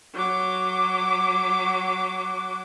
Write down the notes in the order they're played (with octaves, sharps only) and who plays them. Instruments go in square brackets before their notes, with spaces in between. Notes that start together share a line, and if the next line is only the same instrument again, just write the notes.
[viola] F#3 D6